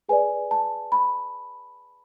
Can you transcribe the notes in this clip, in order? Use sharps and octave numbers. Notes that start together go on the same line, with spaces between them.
G#4 B4 D5 G#5
A5
B5